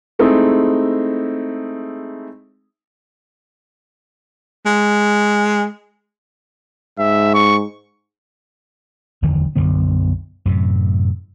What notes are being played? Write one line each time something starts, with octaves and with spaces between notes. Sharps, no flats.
G#3 A3 C4 D#4 E4 G#4
G#3
G#2 E5
C#6
F#1 E2 D3 D#3
B1 F#2 D3 B3
F#2 A2 C3